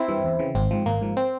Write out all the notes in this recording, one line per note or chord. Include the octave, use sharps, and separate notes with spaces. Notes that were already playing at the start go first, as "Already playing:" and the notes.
Already playing: C4 E4
G2 E3
E2
C#3 E3
G#1 C4
G#2 F3
G#1 A#3
G#2 F3
C4